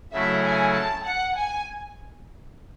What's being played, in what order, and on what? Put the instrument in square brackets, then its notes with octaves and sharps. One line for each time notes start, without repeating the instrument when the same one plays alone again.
[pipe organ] C#3 F#3 A3 E4 [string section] E5
[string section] G#5
A5
F#5
G#5